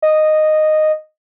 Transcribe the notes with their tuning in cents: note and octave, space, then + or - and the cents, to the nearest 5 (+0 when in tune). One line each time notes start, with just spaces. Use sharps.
D#5 -10